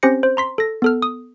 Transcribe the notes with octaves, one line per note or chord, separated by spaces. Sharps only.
C4 C#4 G4 C5 A#6 C#7
C5
A#5 C6 B6
A4 A#6
B3 A4 F6
D#6